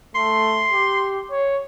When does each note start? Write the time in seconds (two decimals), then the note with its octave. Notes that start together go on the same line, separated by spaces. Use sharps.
0.15 A3 C6
0.72 G4
1.31 C#5